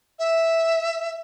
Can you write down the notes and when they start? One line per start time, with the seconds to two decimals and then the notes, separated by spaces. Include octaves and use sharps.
0.19 E5